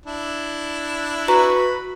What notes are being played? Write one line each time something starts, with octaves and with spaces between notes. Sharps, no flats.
D4 E4
F#4 B4 A#5
B5